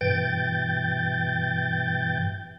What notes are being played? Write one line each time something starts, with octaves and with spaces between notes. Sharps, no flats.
G2 B2 E3 G5 G6 A6